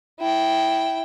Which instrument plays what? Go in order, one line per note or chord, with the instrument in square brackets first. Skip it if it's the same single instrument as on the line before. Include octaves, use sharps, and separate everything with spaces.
[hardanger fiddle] E4 G5